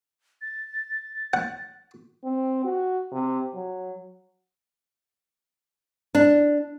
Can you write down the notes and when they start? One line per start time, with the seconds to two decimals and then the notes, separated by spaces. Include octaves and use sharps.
0.41 A6
1.34 F#5
2.24 C4
2.65 F#4
3.12 C3
3.55 F#3
6.15 D4